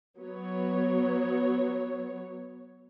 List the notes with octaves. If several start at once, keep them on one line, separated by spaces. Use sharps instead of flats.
F#3 B3 C#5